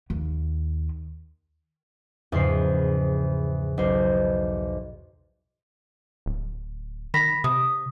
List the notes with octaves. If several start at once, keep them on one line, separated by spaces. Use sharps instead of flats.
D#2
E2 G#2 C#3 F3 C7
B1 C5
D1
D#3 B5 A#6 B6
C3 D#6